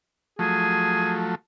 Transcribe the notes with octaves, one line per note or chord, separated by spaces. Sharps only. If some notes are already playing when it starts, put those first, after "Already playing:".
F3 F#3 A3 G#4